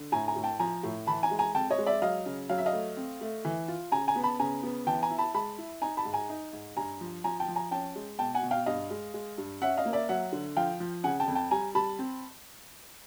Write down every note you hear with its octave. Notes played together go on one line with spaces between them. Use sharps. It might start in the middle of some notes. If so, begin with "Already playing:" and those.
Already playing: D3
A2 G#5 A#5
G#5 A#5
A2
G5 A5
F3 G#5 A#5
A2
E3 A5 B5
G#5 A#5
G#3
G#5 A#5
F2 G5 A5
C#5 D#5
G#3
D5 E5
F#3 D#5 F5
C#3
F#3 F5
E5
D#5 F5
A3
C4
A3
E3
F4
C#3 G#5 A#5
G#5 A#5
B3
A5 B5
C#3 G#5 A#5
B3
E3 G5 A5
G#5 A#5
E4
A5 B5
G#3 A5 B5
E4
D#4 G#5 A#5
A5 B5
G#2
G#5 A#5
D#4
G#2
G2 G#5 A#5
F3
F3 G#5 A#5
G5 A5
F3
G#5 A#5
C#4 G5 A5
G#3
B2 G5 A5
F#5 G#5
B2
F5 G5
G2 D#5 F5
G#3
G#3
G2
C#4 E5 F#5
D#5 F5
A#3
D5 E5
F#3 E5 F#5
D3
F3 F5 G5
F3
C#3 F#5 G#5
G5 A5
F2
G5 A5
G3 G#5 A#5
G3 A5 B5
C4